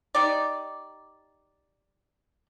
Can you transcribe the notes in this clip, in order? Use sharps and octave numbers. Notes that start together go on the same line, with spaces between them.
D#4 G4 D5